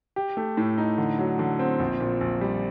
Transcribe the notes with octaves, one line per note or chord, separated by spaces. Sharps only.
G4
A3
A2
D#4
D3
F#3
D3
C4
A#1
A#2
A#1
G3